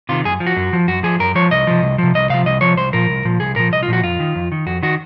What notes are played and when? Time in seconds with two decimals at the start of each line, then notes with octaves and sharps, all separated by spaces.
0.09 C3 D#3 F4
0.25 F#2 G#4
0.40 F3
0.46 F#4
0.56 F#2
0.73 F3
0.88 F#2 F#4
1.03 F3 G#4
1.19 F#2 A#4
1.35 F3 C#5
1.51 C2 D#5
1.67 C3 F3
1.82 C2
1.98 C3 F3
2.15 C2 D#5
2.30 C3 F3 F5
2.45 C2 D#5
2.61 C3 F3 C#5
2.77 C2 C5
2.93 A#2 F3 A#4
3.09 C2
3.25 A#2 F3
3.40 C2 G#4
3.56 A#2 F3 A#4
3.72 C2 D#5
3.83 F4
3.88 A#2 F3 F#4
4.04 F2 F4
4.20 D#3
4.35 F2
4.52 D#3
4.66 F2 F#4
4.83 D#3 F#4